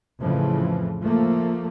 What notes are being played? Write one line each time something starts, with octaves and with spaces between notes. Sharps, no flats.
F2 A2 C#3 E3 F3
F3 A3 A#3